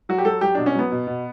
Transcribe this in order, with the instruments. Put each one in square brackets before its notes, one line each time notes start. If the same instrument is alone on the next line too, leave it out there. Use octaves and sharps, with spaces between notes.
[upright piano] F#3 F#4
G4
F#3 A4
F#3 G4
B2 D4
C#4
F#3 B3
B2
B2